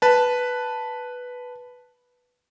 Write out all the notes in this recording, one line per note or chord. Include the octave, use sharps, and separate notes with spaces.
B4 A5